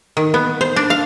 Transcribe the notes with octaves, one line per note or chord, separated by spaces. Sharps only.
D#3
B3
C5
D4
F5